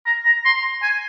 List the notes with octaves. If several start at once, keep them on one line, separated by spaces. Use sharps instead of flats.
A#5
A#5
C6
G#5